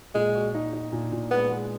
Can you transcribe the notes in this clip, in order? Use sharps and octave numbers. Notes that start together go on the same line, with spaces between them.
A#2 G#3
F#4
D#4
D#4
A#2
A#2
G#3 B3
G#3